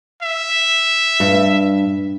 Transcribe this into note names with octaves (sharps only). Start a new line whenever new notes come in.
E5
G2